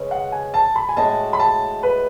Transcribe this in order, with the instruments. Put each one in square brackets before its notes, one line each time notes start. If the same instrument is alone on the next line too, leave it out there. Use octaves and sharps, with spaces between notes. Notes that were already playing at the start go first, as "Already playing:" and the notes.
Already playing: [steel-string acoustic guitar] C#3 G#3 C#4 B4
[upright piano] F#5
G#5
A5
B5
G#5
[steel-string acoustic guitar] A2 G#3 C#4 F#4 [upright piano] A5
[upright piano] B5
A5
B4